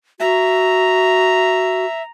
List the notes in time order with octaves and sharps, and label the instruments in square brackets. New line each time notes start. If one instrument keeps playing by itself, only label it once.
[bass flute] F#4 [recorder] E5 [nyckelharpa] A#5